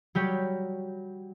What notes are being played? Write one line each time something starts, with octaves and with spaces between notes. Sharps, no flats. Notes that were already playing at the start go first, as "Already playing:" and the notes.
F#3 G3 G4 C#5